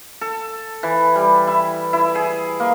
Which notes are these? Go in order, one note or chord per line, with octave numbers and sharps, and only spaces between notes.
A4
E3
G3
E4
E4
G#4
A#3